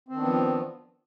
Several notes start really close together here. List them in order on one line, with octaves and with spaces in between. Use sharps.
C4 D#3 D4 B3 F3